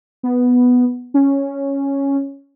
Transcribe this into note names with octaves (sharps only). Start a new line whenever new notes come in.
B3
C#4